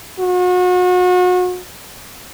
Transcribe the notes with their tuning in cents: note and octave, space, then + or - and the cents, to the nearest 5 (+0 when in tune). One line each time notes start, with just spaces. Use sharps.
F#4 -35